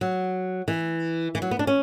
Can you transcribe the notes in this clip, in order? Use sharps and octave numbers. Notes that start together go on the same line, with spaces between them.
F#3
E3
E3
F#3
B3
D4
C#4